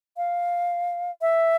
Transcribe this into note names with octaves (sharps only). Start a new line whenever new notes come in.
F5
E5